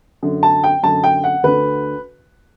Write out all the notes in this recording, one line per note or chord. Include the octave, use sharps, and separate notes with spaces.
F#2 D3
A5
G5
F#2 D3 A5
G5
F#5
D2 D3 B4